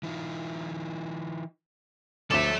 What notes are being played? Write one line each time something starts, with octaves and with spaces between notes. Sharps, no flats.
E3 D#4 F4
D2 F3 G3 A4 C#5 E5 D6 E7